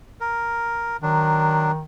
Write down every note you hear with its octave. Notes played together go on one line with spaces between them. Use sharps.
A#4
D#3 F#3 D4